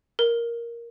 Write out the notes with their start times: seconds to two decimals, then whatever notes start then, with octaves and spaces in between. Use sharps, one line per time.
0.19 A#4